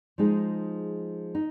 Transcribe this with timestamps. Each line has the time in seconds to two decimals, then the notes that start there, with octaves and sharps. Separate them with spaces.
0.18 F3 G#3 D#4 G#4
1.35 D#4